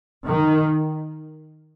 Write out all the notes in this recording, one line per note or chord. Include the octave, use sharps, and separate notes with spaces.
D#3